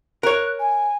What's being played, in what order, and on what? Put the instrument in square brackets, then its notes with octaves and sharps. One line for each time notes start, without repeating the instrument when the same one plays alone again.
[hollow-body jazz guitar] A#4 C#5 [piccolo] F#6
[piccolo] G#5